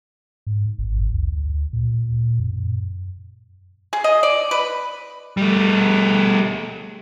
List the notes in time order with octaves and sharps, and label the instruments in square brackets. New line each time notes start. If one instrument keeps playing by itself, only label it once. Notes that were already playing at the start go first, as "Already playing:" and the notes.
[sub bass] G#2
G#1
G2
D2
A#2
F#2
[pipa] G#4
D#5
D5
B4
[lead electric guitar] G3 A3